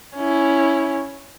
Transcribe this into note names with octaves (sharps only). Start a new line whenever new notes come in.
C#4 E4